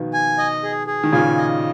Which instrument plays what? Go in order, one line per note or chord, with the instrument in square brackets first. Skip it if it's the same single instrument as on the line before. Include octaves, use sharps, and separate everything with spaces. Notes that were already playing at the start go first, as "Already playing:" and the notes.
Already playing: [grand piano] B2 D#3 F3
[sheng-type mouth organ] G#5
D#5
G#4
G#4
[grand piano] D#3
[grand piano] A#2 C#3 [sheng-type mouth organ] G#5
[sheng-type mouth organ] D#5